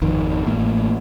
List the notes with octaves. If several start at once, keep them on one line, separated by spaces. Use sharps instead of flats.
G#1 F2 D#3
A1 A#3